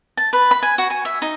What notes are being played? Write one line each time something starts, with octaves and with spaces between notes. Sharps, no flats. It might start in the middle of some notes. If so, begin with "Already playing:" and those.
A5
B4
B5
G#5
F#4
G#5
E5
D#4